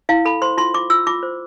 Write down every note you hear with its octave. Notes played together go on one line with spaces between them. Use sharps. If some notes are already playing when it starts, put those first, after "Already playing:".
E4 F5
A4 B5
C5 C6
F4 C6
F4 D6
F4 E6
F4 D6
C5